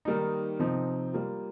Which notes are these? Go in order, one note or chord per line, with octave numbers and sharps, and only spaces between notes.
D#3 G3 A#3 D#4
C3 F3 C4 D#4
G3 A#3 F4